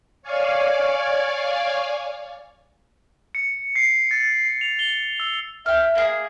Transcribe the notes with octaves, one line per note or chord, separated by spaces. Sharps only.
C#5 D5 F5 G#5
C#7
C7
A6
C7
F7
G7
E6
E5 G5 F6
A#3 G#4